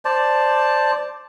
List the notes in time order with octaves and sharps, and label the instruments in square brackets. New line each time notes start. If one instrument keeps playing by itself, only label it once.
[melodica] C5 D5 A5